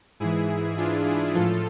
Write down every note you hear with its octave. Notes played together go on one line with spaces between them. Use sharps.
G#2 E3 E4 G#4
D4 F4
E4 G#4
A2 F3 F4 A4